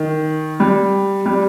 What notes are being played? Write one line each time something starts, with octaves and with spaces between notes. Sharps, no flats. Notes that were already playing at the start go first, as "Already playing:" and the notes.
Already playing: D#3
G3
G3